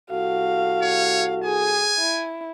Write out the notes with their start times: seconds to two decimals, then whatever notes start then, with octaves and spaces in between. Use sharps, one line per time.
0.11 C2 F#4 A4 F5
0.82 C#5
1.44 G#4 G#5
1.98 E4